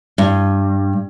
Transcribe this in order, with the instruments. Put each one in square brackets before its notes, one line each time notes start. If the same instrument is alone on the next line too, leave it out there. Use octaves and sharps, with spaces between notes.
[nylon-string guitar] G2